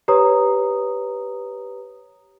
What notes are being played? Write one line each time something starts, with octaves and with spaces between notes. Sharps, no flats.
G4 B4 C#5 A#5 D#6